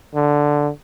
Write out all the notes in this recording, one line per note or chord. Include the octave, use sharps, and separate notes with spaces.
D3